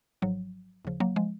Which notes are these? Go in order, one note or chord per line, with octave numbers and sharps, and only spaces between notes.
G#1 G#2 F3 F#3
D#2 C#3 F3
F#3 A#3
F3 G#3